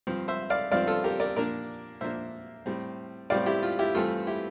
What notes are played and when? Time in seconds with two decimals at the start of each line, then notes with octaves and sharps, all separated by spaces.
0.07 G2 F3 C4
0.28 C5 E5
0.50 D5 F5
0.72 G2 F3 C4 D5 F5
0.87 F4 A4
1.04 G4 A#4
1.20 A#4 D5
1.36 A#2 F3 A#3 D4 A#4 D5
2.01 A#2 F3 A#3 D4 C5 E5
2.66 A2 G3 C4
3.30 A2 G3 C4 D5 F5
3.46 E4 G4
3.63 F4
3.79 E4 G4
3.95 G2 E3 A3 C4 F4 A4
4.27 E4 G4